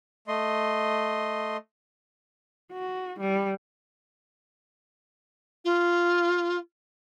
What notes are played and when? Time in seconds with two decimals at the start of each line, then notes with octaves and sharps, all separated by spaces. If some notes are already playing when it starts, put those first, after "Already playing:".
0.28 A3 D#5 C6
2.72 F#4
3.20 G3
5.65 F4